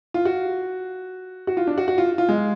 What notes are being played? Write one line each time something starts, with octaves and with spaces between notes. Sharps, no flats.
F4
F#4
F#4
F4
D4
F#4
F#4
F4
F4
G#3